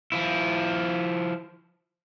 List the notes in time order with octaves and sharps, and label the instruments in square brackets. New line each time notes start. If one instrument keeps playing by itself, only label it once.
[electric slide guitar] F3 E4